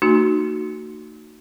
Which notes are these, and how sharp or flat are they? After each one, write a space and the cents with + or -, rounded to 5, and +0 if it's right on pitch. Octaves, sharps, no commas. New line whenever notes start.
A3 +45 D#4 -25 F#4 +5